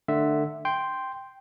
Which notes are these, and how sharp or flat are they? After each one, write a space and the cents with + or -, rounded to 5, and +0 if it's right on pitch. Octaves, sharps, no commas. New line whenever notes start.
D3 +20 A3 +0 E5 +0
G5 +0 C6 +0